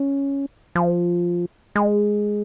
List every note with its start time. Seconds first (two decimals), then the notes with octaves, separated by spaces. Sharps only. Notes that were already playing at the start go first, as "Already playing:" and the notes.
Already playing: C#4
0.75 F3
1.75 G#3